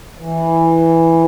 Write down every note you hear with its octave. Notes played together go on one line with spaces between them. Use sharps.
E3